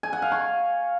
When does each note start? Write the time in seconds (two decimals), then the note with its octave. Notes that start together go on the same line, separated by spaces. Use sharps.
0.03 G#5
0.13 F#5
0.22 F5
0.32 C#6